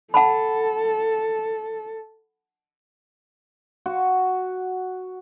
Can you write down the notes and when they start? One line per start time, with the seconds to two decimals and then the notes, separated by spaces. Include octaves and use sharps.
0.14 A4 F#5 A5 B5
3.86 F#4